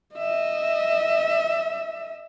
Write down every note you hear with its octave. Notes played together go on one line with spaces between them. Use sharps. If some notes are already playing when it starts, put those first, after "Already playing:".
D#5 E5